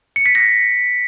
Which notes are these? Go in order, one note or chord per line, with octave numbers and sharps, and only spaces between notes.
C#7
B6
A#6